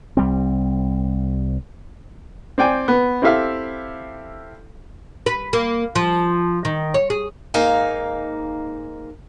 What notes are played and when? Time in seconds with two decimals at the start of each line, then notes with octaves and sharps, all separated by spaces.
0.17 C2 G3 C4
2.58 C4 D5 G5 G#5
2.88 B3
3.22 C4 E4 G4 A4 E5 F5
5.26 B4
5.53 A#3
5.95 F3
6.65 D#3
6.94 C#5
7.10 G#4
7.54 G#2 A#3 D#4 F5 G#5